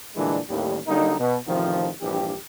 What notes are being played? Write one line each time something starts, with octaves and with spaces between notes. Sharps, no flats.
A#2 D3 E3 G3 G#3 D4
A1 D#2 G3
D3 F#3 G3 A#3 D#4
B2
A1 C3 D#3 F3
A#1 G2 E3 G4